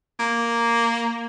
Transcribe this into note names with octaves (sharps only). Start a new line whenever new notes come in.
A#3